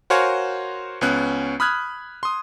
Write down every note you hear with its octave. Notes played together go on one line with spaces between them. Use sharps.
F#4 A#4 C5 C#5 F5 G#5
C#2 B3 C#4 F#6
B5 D#6 F6 F#6 G#6
C6 D#6